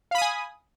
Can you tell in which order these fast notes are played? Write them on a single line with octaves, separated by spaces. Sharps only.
F5 B5 D#6 G#5